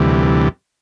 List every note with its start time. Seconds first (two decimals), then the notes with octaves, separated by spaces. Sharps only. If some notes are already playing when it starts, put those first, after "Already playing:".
Already playing: D2 C3 E3 G3